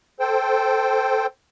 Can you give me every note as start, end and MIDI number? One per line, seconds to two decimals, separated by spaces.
0.20 1.27 69
0.20 1.27 72
0.20 1.27 79